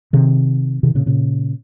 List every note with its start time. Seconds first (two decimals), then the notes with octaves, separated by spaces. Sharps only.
0.13 C3 D#3
0.83 C3 D#3
0.95 A#2 C#3
1.06 A#2 C#3